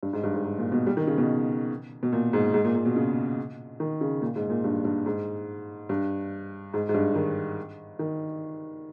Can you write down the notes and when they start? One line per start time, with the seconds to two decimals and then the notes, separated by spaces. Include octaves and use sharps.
0.03 G2
0.13 G#2
0.24 G2
0.34 G#2
0.44 G#2
0.58 A#2
0.72 B2
0.86 G3
0.97 D#3
1.07 C#3
1.18 B2
2.03 B2
2.13 A#2
2.33 G#2
2.54 G#2
2.64 A#2
2.75 A#2
2.85 B2
2.96 C#3
3.80 D#3
4.01 C#3
4.22 A#2
4.36 G#2
4.50 A#2
4.64 G2
4.85 G2
5.06 G#2
5.89 G2
6.74 G#2
6.89 G#2
6.94 G2
7.15 D#3
7.99 D#3